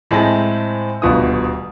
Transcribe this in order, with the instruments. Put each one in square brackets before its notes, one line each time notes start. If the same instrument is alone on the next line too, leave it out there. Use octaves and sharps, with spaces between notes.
[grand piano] A2 G#3 C4 A5 A#6
D#1 D2 B2 F4 D#6